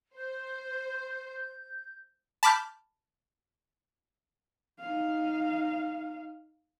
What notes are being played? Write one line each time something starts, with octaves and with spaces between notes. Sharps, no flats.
C5 G6
A5 B5 D6 F6 G6
D#4 F5